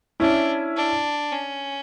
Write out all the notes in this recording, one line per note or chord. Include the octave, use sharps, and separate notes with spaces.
C#4 D4 E4
D4
C#4